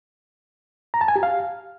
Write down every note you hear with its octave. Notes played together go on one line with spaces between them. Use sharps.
A#5
A5
G#5
G4
F5